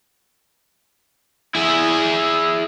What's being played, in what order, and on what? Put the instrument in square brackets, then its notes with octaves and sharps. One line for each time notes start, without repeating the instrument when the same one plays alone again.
[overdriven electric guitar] E4 G#4